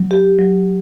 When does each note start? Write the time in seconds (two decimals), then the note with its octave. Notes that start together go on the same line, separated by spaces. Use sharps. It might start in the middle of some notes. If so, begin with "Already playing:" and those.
Already playing: F#3
0.11 G4
0.39 F#3